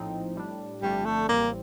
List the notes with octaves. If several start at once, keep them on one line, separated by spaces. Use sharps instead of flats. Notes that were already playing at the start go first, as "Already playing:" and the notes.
Already playing: A#1 A2 F3 C4 D#4
A2 G3 D4
G1 F2 D3 G3 A3 D4
A3
A1 A2 G3 A#3 C4